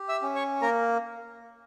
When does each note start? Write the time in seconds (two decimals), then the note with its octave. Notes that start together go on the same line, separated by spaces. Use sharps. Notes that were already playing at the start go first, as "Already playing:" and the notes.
Already playing: G4
0.09 E5 E6
0.22 C#4
0.35 C#5 C#6
0.61 A#3 A#4 A#5